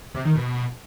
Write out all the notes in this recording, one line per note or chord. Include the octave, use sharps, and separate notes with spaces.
C3
D#3
B2